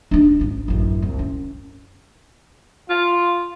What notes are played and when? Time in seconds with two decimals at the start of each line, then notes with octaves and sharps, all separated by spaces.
0.11 D4 D#4
0.40 G#1 C#4
0.68 A1 F#2
1.02 C2
1.19 C#4
2.89 F4